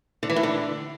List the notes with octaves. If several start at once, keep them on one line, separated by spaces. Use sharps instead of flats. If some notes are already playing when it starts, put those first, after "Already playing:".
D3
E3
A2
D3